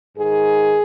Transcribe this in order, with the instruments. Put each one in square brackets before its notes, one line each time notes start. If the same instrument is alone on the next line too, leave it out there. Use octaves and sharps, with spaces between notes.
[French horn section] G#2 D#3 G#4